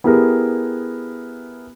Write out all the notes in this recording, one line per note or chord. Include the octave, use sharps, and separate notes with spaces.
B3 E4 G4 G#4 A#4